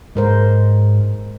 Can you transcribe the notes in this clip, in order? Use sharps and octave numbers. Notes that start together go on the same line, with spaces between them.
G#2 G#3 A#4 C5